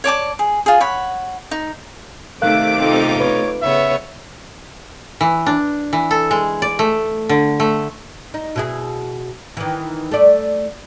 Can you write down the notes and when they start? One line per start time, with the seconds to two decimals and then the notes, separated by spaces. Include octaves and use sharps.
0.04 C#5 D5 A5 D6
0.39 G#4
0.66 F4 G#4
0.80 C#5 F#5 B5
1.51 D#4
2.42 C3 D#3 A3 A#4 F5 D6 F#6
2.79 C4 D#4 F4
3.20 B4 C#5
3.62 C#3 B3 C#5 E5
5.21 E3
5.46 D4
5.93 E3
6.11 A4
6.31 G#3
6.62 D5
6.79 A3
7.29 D3
7.60 A3
8.34 D#4
8.56 B2 E4 G#4
9.57 D#3 E3
10.11 A3 D5